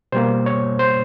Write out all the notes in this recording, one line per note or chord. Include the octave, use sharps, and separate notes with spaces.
B2 G3 A#3 C5
C#5
C5